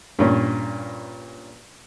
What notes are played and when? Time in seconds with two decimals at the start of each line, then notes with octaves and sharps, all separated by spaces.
0.19 G2 A#2 C#4